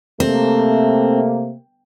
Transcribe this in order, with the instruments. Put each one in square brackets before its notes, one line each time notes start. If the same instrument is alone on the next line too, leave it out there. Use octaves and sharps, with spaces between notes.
[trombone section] C3 A3 A#3 [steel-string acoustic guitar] C4